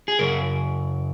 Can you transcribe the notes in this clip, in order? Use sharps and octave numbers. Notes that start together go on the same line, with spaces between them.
G#4
F#2 C#3 A#4